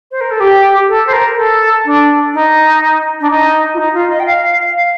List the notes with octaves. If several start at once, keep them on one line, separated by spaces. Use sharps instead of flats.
C5
A#4
A4
G4
A4
C5
A#4
A4
D4
D#4
D4
D#4
F4
D#4
F4
D#5
G5
F5
F5